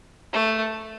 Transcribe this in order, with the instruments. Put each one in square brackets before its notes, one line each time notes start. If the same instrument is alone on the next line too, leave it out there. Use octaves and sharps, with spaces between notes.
[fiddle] A3